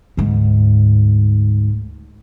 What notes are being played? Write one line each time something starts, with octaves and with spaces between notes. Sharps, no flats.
D2 G#2